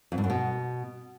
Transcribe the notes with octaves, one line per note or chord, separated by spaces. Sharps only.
F2
G2
F#2
B2